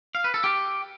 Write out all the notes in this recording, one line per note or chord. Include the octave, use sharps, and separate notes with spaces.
F5
B4
A4
G4